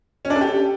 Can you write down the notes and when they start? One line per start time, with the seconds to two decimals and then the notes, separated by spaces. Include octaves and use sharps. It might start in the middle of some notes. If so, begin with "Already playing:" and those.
0.25 C#4
0.30 D4
0.36 A4
0.41 G4